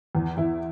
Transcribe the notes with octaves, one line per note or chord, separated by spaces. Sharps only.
E2
E2 E4